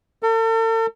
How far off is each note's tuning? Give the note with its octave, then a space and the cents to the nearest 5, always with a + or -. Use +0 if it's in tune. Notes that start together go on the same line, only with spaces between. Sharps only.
A4 +45